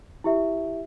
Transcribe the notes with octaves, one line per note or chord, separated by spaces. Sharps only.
E4 G4 E5